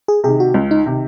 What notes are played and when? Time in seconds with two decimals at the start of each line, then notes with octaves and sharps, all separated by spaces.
0.08 G#4
0.24 C3 D#3 G#4
0.40 F#4
0.54 C#2
0.71 D#4
0.86 C3 D#3